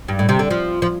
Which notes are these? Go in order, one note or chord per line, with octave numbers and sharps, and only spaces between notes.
G2
A2
C3
D3
F3
F3